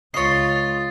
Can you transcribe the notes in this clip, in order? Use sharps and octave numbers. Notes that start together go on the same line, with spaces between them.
C#2 F4 C#5 D#5 A6 C7